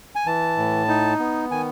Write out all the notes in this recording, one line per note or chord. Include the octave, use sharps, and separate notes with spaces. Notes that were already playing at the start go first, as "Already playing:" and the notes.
G#5
E3 A5
A2
D#4
B3
D#3 G#5